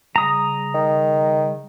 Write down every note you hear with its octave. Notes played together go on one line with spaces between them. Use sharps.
C#3 G3 A#5 D#6
D#3